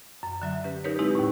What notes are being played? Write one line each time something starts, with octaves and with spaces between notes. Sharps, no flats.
F#2
D3 F#3 E5
C#4 G4 B4
D#4 G4 A#4 B4 C#5
G#3 C4 D#4 E4 G4
D#2 A2